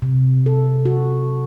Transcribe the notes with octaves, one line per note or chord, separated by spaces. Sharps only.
C3
A4
F#4